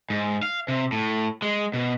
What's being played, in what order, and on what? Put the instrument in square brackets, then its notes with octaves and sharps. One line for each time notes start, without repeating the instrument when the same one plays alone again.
[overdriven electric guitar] G#2
F5
C3
A2
G#3
B2